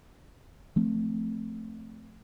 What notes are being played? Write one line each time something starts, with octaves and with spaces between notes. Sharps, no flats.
F3 A3 C4